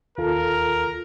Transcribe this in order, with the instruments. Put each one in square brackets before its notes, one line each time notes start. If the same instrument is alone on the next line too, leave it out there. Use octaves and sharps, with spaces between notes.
[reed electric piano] D#2 F4 A4 [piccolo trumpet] A#4